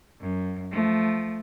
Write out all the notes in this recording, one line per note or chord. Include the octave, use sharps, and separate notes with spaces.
F#2
F3 A3